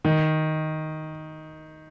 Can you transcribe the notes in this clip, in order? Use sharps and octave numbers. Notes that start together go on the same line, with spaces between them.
D#3